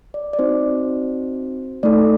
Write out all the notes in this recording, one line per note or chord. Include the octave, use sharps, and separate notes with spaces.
D5
D5
C4 D#4 F#4 C5
A3 D#4 A4 D5